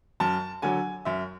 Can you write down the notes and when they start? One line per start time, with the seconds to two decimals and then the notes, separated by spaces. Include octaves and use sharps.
0.20 F#2 A5
0.62 D3 F#3 G#5
1.05 F#2 E5